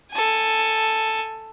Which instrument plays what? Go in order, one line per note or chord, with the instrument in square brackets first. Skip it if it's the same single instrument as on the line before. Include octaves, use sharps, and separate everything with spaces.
[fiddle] A4 G#5